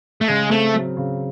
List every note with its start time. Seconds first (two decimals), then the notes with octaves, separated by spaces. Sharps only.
0.21 A3
0.28 C#3 G#3
0.51 A3 C4
0.74 F#3
0.97 C#3